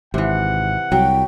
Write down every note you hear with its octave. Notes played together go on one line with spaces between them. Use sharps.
G#1 C3 E3 F#5
C2 F#3 G5